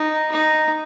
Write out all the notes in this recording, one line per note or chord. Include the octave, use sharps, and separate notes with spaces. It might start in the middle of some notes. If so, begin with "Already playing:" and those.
Already playing: D#4
D#4